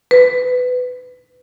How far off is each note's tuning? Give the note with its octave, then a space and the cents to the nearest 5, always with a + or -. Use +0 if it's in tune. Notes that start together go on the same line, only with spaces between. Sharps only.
B4 +20